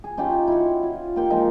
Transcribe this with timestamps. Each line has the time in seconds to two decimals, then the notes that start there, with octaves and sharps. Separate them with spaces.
0.04 G#4
0.17 C#4 D#4 F4 G4
0.47 E4 F#4
0.83 F4
1.16 A#3 G4 C6 C#6
1.30 F3 G#3 D#4